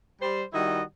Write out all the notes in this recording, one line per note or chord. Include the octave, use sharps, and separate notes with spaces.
G3 C5
D#3 G3 E4 F#4 D#5